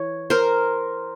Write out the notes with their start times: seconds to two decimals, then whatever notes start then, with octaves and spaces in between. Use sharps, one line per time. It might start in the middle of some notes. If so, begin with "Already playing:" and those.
Already playing: E3 C#5
0.30 A#4 C5